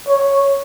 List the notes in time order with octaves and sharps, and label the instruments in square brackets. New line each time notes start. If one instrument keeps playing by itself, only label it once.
[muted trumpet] C#5